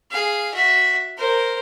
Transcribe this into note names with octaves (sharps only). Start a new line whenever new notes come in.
G#4 F5
F#4 E5
A#4 C5